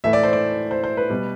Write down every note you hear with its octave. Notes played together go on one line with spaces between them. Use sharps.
A2 E3 A3 E5
D5
C5
D5
C5
C5
B4
B2 G3